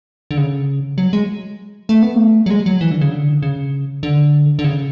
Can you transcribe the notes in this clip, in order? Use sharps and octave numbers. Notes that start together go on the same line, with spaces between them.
D3
C#3
F#3
G#3
A3
B3
A3
F#3
G#3
F#3
E3
D3
C#3
D3
C#3
D3
D3
C#3